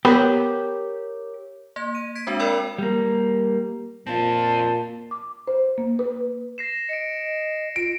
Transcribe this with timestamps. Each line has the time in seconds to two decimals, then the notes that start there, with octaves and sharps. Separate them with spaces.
0.05 B3 G4 A#4 C#5
1.76 A#3 G#6
1.95 D#7
2.15 G#6 B6 D7
2.27 G#3 C4 D4 F#4
2.39 A#4 D5 G5 B5 E6
2.78 G3 A#3
4.07 A#2 C4 F4 A5
5.11 D6
5.48 C5
5.78 A#3
5.99 B4
6.58 A#6 C7 E7
6.89 D#5 C#7 D7
7.76 F4 D7